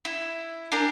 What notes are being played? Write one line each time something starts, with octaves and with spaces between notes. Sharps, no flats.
E4
D4 G4 A#4 G#5